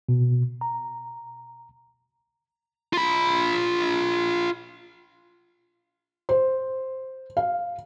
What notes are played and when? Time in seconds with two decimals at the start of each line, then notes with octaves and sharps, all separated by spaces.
0.09 B2
0.61 A#5
2.93 F4 B5
6.29 C5
7.37 F5